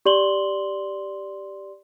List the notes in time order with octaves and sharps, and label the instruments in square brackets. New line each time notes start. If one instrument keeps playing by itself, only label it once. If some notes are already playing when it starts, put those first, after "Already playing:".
[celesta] G4 D5 C6 F#7 G7